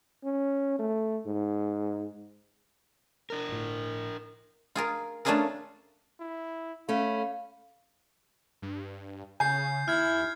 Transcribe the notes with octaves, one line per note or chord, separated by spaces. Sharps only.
C#4
A3
G#2
D4 A#4
G1 A2
F4 G#4 A#4
A3 C#4 D4 F4 G#4 A#4
E4
A3 C#4 F5 B5
G2
C#3 G#5 G6 C7
D#2 E4 F6 G#6